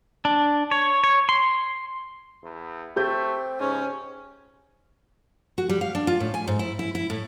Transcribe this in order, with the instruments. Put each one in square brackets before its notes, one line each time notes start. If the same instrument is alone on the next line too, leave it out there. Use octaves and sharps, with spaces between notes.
[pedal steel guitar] D4
C#5
C#5
C6
[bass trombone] E2
[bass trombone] A3 [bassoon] C4 [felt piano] G4 G6
[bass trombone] C#2 [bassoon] G#2 [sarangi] C#4
[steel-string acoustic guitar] F#4
G3
F5
D4
F4
A2
G#5
G#2
E4
E4
E4
A2